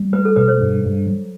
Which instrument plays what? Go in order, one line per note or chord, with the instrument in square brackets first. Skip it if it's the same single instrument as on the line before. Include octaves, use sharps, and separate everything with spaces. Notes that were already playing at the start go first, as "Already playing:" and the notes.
Already playing: [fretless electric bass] G3
[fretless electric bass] A3 [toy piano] B4
[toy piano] A4
[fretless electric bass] B2 [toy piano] B4
[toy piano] C5
[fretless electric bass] G2
G2
F#3